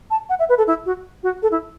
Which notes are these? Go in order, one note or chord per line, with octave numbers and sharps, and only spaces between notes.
A5
F#5
E5
B4
A4
E4
F#4
F#4
A4
E4